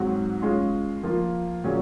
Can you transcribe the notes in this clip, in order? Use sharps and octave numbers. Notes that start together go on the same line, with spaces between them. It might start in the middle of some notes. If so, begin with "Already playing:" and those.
Already playing: G#2 F#3 C4 F#4
G#3 C#4 F4
F3 A#3 F4
A#2 F#3 C#4 G#4